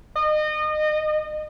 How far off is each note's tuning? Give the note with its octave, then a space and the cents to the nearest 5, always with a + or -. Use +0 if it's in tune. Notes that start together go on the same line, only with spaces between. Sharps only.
D#5 -30